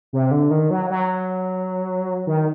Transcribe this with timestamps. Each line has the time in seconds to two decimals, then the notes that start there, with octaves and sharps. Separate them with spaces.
0.13 C3
0.31 D3
0.51 D#3
0.70 F#3
0.90 F#3
2.27 D#3